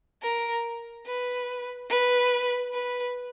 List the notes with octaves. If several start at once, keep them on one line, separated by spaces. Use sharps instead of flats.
A#4
B4
B4
B4